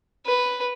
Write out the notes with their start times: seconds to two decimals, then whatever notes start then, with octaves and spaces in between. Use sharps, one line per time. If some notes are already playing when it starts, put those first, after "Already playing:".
0.26 B4